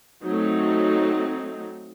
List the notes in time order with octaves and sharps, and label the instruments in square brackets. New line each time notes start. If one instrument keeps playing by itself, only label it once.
[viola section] F#3 A3 C4 D#4